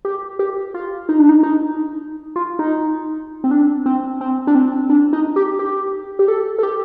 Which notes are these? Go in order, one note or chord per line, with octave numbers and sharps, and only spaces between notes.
G4
G4
F4
D#4
D4
D#4
D#4
F4
D#4
C4
D4
C4
C4
D4
C4
D4
D#4
G4
G4
G4
A4
A4
G4